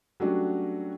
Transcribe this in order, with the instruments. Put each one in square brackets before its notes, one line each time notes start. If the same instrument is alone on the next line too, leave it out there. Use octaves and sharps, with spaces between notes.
[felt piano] F#3 G3 A3 C#4 D4 F#4